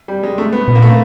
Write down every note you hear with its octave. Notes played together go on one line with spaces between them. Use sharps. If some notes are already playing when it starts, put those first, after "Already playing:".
G3
G#3
A3
B3
A#2 B3
A#3
A3
A#3